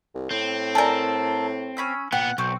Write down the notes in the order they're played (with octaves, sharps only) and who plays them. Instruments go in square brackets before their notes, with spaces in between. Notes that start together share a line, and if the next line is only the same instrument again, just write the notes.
[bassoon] C2
[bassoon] A2 [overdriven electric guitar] C4
[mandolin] A4 A#4 [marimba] D5 G#5 A5
[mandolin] C#4 B5 E6
[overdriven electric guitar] A#2 B3 [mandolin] F#5 [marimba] G5
[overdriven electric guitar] B1 [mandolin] C4 F#4